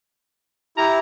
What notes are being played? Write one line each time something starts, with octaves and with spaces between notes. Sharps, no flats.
E4 G4 A#5